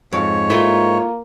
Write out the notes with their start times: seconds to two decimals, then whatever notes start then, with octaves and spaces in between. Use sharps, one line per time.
0.13 F2 G#2 C#5
0.50 A3 A#3 E4 F4 E5